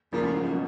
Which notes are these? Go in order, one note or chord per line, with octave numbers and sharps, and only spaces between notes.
A#2 C#3 F3 A#3
A2
G#2
F#2
B2